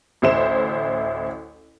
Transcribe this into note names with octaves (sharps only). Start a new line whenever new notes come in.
A1 D2 E4 C5 E7